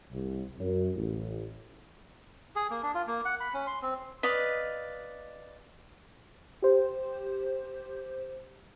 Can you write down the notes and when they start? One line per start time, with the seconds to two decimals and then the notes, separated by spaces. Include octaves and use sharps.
0.10 C2
0.58 F#2
0.94 A1
2.56 G#4
2.70 A#3
2.83 D4
2.95 F4
3.07 A#3
3.25 F#5
3.40 B5
3.54 C#4
3.67 C6
3.82 C4
4.23 B4 D5 D#5 F5
6.62 G4 C5